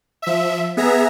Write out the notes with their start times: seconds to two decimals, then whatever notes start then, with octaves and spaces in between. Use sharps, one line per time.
0.22 F3 E5
0.77 B3 G#4 E5 A#5